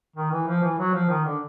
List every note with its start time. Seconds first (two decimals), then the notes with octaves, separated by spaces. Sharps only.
0.16 D#3
0.31 E3
0.47 F3
0.63 E3
0.78 F#3
0.94 F3
1.09 D#3
1.24 D3